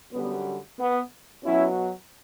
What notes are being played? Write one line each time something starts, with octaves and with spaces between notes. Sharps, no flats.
F#2 D3 G3 B3
B3
B2 F#3 C#4 E4